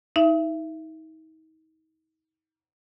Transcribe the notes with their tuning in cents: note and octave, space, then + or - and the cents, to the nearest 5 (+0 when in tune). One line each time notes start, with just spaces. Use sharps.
D#4 +35 E5 +25